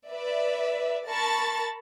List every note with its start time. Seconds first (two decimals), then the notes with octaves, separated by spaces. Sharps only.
0.11 B4 D5 E5
1.08 A#4 A5 B5 C#6 A6